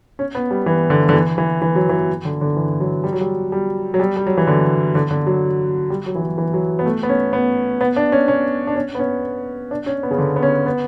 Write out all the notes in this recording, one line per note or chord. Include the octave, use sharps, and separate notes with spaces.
C#4
B3
G3
E3
D3
D3
E3
E3
E3
F#3
E3
D3
D3
E3
F#3
G3
F#3
G3
G3
F#3
G3
G3
F#3
E3
D3
D3
D3
F#3
G3
F#3
E3
F#3
E3
F#3
B3
A3
B3
C#4
B3
B3
D4
C#4
C#4
D4
C#4
B3
C#4
D4
C#4
B3
C#3
D3
B3
C#4
B3